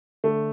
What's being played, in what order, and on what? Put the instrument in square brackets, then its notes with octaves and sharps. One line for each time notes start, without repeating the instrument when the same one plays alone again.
[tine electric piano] D3 [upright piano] A3